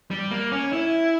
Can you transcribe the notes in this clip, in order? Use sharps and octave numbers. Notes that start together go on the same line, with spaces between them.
G3
A#3
C#4
E4